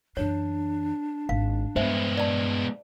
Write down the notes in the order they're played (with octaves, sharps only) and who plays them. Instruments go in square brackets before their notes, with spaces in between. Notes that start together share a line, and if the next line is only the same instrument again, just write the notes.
[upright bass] F#2 E3 [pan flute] D4 [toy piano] C#5
[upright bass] G#1 [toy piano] F5
[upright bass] G2 [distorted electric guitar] G#3 B3 [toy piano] C5 E5
[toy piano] D5 A5